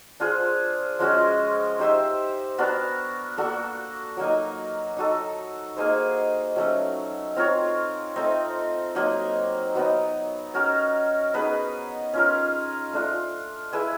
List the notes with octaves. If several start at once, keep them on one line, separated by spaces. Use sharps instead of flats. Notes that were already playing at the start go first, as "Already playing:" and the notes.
D4 F4 G#4 C5
F3 G#3 C#4 F#4
D#4 G4 C5 E5
B3 D4 F#4 A#4
A#3 D4 F#4 A4
F#3 A#3 D#4
D#4 F#4 A4
A#3 D#4 G#4 C5
F#3 A3 C#4
C4 F4 A#4 C#5
A3 C4 D#4
F#3 A#3 D#4
F#3 B3 D#4
C#4 F#4 A#4
B3 D#4 G#4 B4
C#4 F4 A#4
A3 D4 F4
E4 G#4 B4 E5